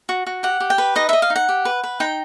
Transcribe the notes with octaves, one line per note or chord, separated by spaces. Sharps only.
F#4
F#4
G4 F#5
G4
G5
B4
D#4 D#5
D#5 E5
F5
D#4
F#5
G4
B4
B4
D#4 G5